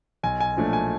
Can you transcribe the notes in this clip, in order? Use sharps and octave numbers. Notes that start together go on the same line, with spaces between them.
B1 G#5
G#5
A#2 F3 A3 D4
G#5